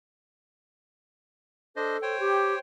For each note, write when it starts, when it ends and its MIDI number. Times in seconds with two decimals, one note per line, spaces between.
1.76 1.97 62
1.76 2.19 69
1.76 1.97 72
1.76 1.97 75
2.02 2.59 72
2.02 2.59 73
2.02 2.59 79
2.20 2.54 67